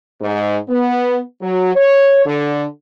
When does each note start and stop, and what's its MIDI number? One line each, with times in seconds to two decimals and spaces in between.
0.22 0.57 44
0.69 1.20 59
1.42 1.74 54
1.75 2.25 73
2.26 2.65 50